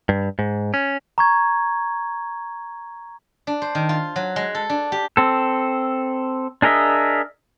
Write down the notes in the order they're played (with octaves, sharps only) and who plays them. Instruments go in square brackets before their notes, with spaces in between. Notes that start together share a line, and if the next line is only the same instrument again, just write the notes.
[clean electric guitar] G2
G#2
C#4
[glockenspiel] A#5 C#6 G#6
[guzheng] D4
C5
D#3
F4
F#3
G#3
A4
D4
G4
[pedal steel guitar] C4 A4
D4 G#4 A#4 D#5 E5